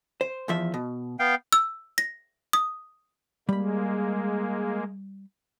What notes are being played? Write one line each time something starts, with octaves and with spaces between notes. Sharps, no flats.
C5
E2 F3 E5
B2
B3 F5 G5
E6
A#6
D#6
G3 G#3 A#3 B5